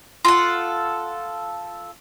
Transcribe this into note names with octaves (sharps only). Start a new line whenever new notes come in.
F4 A4 F#5